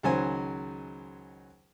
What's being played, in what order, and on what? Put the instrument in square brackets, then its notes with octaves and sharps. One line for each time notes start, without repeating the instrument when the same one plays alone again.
[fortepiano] C#2 D#3 F#3 C5 G#5